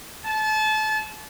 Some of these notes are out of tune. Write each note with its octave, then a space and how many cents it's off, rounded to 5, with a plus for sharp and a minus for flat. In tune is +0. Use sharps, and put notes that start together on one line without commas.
A5 -30